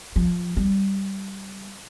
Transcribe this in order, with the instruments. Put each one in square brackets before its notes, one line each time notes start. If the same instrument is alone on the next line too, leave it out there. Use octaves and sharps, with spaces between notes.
[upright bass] F3
G3